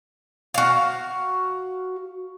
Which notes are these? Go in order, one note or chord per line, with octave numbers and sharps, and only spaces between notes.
F#4 F5